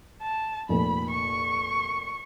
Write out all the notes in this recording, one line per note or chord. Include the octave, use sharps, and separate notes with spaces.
A5
F1 A#2 B5
C#6